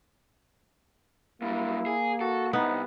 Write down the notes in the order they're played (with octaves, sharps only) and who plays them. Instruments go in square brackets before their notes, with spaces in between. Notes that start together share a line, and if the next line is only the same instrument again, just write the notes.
[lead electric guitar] F#2 G3 [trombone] A#3 [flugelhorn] E4
[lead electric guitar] G#4
[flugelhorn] F#4 [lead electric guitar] A4
[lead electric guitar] C2 [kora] B3 [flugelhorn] D#4